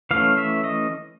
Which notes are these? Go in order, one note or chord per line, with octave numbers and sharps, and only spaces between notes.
E3 A3 C#4 F5
E5
D#5